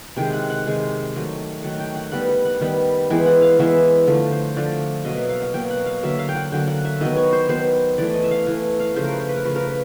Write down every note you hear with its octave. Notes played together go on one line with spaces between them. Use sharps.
C3 D#3 G#3 G5
F#5
F#5
C3 D#3 G#3
D#3 F#3 A3
D#3 F#3 A3 F#5
G5
F#5
D#3 G3 B3 F#5
F#5
F#5
D#3 G3 B3
E3 G#3 B3 G5
F#5
F5
E3 G#3 B3 E5
D3 F3 A3
C5
D3 F3 A3 D5
B2 F#3 A#3 D#5
E5
F5
F#5
B2 F#3 A#3 G5
F#5
F5
D3 F#3 A#3 E5
F5
G5
F#5
D3 F#3 A#3 G5
F#5
E5
D#3 F#3 B3 D#5
C#5
C5
D#3 F#3 B3 C5
E3 A3 D5
D#5
E5
F5
E3 A3
F5
C#3 F3 A3 C5
A#4
B4
B4
A#4
C#3 F3 A3 B4
A#4 B4